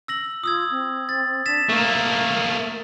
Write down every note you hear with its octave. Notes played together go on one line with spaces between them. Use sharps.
E6 A#6 F#7
F4 D#6 E6 G#6
C4
A6
D4 A6 B6 E7
A3 A#3 A#4